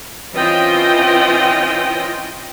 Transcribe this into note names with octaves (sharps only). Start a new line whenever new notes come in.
E3 C4 C#4 F4 D#5 G5